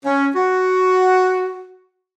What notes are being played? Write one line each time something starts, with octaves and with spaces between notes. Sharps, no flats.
C#4
F#4